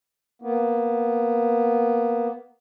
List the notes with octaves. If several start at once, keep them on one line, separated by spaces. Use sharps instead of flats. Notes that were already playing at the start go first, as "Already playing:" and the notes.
A#3 B3